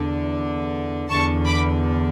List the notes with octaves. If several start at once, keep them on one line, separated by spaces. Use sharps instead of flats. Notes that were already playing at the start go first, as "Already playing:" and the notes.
Already playing: E2 D3
E2 D3 A5 C#6
B5 D6